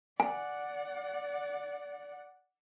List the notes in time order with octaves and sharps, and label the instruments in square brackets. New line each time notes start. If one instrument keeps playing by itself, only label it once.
[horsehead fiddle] D5 F#5 [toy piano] G#5